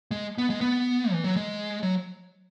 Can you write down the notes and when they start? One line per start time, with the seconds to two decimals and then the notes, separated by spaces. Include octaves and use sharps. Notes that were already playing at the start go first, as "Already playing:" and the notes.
0.11 G#3
0.38 B3
0.50 G#3
0.61 B3
1.12 E3
1.24 F#3
1.36 G#3
1.83 F#3